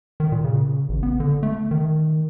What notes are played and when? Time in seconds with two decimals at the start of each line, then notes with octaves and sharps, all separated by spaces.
0.20 D#3
0.32 A#2
0.44 C#3
0.89 A1
1.03 B3
1.20 D3
1.43 A3
1.71 D#3